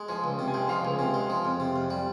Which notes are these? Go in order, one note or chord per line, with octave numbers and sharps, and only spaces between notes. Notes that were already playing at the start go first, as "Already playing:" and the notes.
Already playing: G#3
F3 G#5
C#2
C3
G#5
G#3 G5
F3 F5
C#2 G#5
C3 G#5
G#3
F3
F2
C3
F2
G3